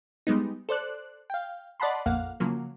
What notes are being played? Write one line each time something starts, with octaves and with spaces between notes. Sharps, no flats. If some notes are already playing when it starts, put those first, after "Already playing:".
G3 G#3 B3 D#4
A4 C5 D5 F#6
F5 G5
D5 D#5 F#5 A5 B5 C6
A#1 F2 A#3 F5 F#5
C#3 F3 F#3 A#3